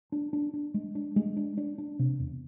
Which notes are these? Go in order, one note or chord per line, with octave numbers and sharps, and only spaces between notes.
D4
D4
D4
G#3
D4
G#3
D4
D4
D4
C3
E2